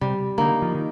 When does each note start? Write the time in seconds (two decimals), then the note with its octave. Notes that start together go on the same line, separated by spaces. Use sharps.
0.01 C3 G3
0.38 D3 A#3 D#4
0.62 F3
0.75 D#3